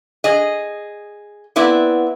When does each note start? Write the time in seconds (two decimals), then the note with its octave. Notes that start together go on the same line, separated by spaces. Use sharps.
0.24 G#4 D#5
1.56 B3 C4 E4 B4 D5